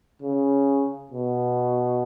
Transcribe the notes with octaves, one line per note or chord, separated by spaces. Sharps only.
C#3
B2